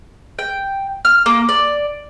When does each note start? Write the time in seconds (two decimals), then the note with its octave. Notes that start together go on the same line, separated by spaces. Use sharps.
0.39 G5
1.05 F6
1.26 A#3
1.49 D5